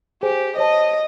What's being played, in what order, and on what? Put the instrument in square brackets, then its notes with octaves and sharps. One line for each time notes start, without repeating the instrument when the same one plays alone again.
[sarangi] G4 [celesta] G#4 C5 G#5
[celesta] C5 C#5 A5 [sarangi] D#5